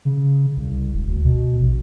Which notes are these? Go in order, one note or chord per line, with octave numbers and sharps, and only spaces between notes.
C#3
C2
E1
D2
B2
A#1